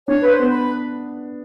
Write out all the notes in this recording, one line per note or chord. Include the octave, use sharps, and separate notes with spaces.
D4 C#5
B4
C5
B3
B4